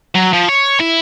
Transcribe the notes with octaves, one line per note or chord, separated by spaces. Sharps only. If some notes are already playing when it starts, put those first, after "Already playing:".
F#3
F3
C#5
E4